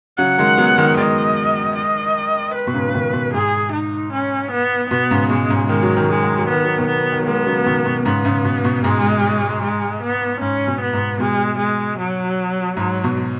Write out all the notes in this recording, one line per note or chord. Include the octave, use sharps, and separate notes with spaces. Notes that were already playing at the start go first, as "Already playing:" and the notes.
C#3 F#3 F#5
D#3 G#3
F#3 B3
F#3
D#3 G#3
D#3 G#3 D#5
D#5
B4
B2
G#2 C#3
C#3
B2 D#3
B2
G#2 G#4
D#4
C#4
B3
B2 B3
G#2 C#3
B2 G#3
G#2 C#3
D#3 G#3
F#3
D#3
F#3 G#3
D#3
F#3
D#3 B3
F#3
B2 D#3
B3
D#3
F#3
D#3 G#3 B3
C#3 F#3
B2 D#3
B2
G#2 C#3 B3
G#2 C#3
B2
B2
G#2 G#3
G#3
B3
G#2 C#4
B2
B3
G#2
B2 G#3
G#3
F#3
G#2 F#3
B2